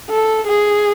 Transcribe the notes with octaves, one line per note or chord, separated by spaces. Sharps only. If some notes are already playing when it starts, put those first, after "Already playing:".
A4
G#4